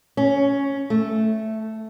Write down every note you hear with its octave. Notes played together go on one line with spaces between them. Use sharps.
C#4
A3